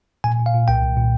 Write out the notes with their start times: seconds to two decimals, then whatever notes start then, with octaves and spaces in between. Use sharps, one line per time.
0.24 A#2 G#5
0.39 A#2
0.46 F5
0.54 A#2
0.68 C2 G5
0.83 C2
0.97 A#2